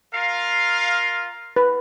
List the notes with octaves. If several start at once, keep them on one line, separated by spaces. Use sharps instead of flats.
F4 A#4 F5
B4